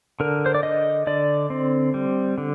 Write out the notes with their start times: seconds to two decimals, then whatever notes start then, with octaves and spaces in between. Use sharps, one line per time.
0.20 D3 A#4
0.46 C5
0.55 D5
0.63 D3 D#5
1.07 D3 D5
1.50 C4
1.94 G3
2.38 D3